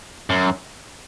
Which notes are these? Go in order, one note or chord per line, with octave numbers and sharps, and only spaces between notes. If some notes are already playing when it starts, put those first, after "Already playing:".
F#2